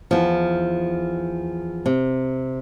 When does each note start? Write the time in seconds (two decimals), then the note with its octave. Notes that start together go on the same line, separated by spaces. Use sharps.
0.11 E2 F3
1.86 C3